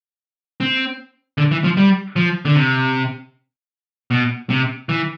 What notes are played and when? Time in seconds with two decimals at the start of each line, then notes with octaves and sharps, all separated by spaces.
0.60 C4
1.38 D3
1.51 E3
1.64 F3
1.77 G3
2.16 F3
2.45 D3
2.55 C3
4.11 B2
4.50 C3
4.89 E3